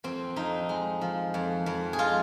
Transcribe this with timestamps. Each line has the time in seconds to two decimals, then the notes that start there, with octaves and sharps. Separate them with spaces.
0.04 F2 C4
0.36 F2 D#4
0.69 G#3
1.01 F3
1.34 F2
1.66 F2
1.93 G#4
1.98 G#3 F4